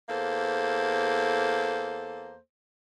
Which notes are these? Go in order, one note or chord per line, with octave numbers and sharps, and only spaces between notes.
E2 A#3 A4 C5